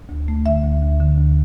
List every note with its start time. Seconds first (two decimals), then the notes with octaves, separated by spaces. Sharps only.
0.09 D2
0.28 A3
0.46 D3 E5
0.64 D2
0.82 D2
1.00 D3
1.18 D2